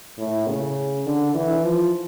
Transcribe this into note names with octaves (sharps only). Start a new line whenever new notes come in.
A2
C#3
D3
E3
F3